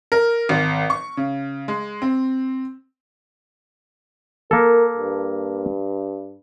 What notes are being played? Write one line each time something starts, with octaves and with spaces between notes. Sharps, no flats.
A#4
G#1
C#6
C#3
G#3
C4
A#3 A4 A#4
G2